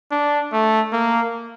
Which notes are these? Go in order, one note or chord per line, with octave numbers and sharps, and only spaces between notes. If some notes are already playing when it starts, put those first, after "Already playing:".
D4
A3
A#3